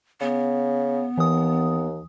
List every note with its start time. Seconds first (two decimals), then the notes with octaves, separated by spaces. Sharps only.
0.21 C#3 B3
1.18 D#2 E3 D#6